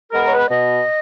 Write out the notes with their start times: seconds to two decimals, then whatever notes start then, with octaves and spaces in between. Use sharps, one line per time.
0.12 G#3 B3 A#4
0.26 C#5
0.32 B4
0.50 B2 D#5